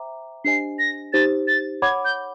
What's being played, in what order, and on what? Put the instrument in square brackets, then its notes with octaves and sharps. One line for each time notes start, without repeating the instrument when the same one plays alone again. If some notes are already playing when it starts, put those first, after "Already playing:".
Already playing: [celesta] C5 E5 G5 A#5 D6
[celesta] D4 G4 C5 D#5 G#5 [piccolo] C7
[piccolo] A#6
[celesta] D#4 G4 C5 [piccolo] A6
[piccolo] A6
[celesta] C#5 F#5 B5 D6 [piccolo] G#6
[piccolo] G6